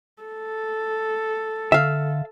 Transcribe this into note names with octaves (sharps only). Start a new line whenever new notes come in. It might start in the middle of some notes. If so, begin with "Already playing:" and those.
A4
D3 E5 F5